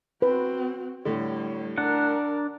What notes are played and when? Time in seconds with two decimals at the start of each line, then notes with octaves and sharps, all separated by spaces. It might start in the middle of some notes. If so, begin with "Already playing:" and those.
0.22 C4 F#4 B4
1.05 A2 D3 G3 C#5
1.78 D4 A#4 F#5